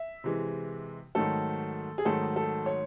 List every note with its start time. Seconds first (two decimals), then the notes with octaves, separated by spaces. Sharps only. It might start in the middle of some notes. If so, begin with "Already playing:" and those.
Already playing: E5
0.24 C3 E3 G#3
1.15 G#2 D#3 F#3 A3 A4
1.98 G#4
2.05 G#2 D#3 F#3 A3 A4
2.36 A4
2.66 C#5